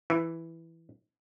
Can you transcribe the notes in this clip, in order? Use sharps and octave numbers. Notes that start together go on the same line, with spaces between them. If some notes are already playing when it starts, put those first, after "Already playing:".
E3